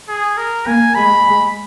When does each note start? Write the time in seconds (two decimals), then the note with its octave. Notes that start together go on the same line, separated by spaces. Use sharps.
0.08 G#4
0.37 A#4
0.67 A#3 G#5
0.95 G#3 B5